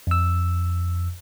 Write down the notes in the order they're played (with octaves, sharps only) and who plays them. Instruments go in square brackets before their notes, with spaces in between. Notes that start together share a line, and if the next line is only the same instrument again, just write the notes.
[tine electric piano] F2 E6